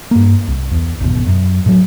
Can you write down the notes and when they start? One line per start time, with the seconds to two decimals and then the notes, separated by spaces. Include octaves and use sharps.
0.11 G2 A#3
0.48 C2
0.71 E2
1.00 G#1 E2 B2
1.27 F#2
1.66 A2 F#3